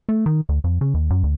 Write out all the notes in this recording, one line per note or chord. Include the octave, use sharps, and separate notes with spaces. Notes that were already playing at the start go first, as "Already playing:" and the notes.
A3
D#3
D2
F2
C#3
D#2
F#2
D2